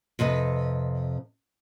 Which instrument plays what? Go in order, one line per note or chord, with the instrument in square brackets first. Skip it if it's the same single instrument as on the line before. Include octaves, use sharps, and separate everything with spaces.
[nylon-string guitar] F2 C3 B4 D#5